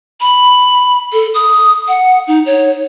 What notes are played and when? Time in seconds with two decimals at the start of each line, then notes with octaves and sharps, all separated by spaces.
0.21 B5
1.13 A4
1.34 D#6
1.88 F#5
2.27 D#4
2.46 C#5